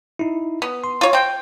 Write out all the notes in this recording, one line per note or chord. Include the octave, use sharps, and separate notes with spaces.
D#4 E4
B3
C6
F4 C#5
C4 G5